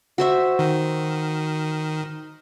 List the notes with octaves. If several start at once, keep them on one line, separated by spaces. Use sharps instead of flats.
F#4 C5 E5
D#3